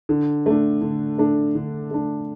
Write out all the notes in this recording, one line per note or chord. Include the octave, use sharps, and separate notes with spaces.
D3
A3 D4
D3
A3 D4
D3
A3 D4